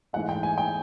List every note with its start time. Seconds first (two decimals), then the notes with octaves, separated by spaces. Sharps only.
0.13 G#2 E3 A3 F#5
0.29 G5
0.43 G#5
0.58 G5